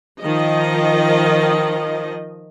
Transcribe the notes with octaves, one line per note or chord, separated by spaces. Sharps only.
D#3 F3 D#5